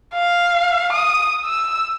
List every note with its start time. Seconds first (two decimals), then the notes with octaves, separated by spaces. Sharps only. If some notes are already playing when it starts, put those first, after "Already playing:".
0.14 F5
0.93 D#6
1.45 E6